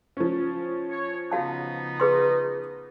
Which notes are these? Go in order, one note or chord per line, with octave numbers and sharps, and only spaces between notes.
F3 C#4
C#5
C#3 B3 D#4 F#4 F5 A5
G#4 B4 C6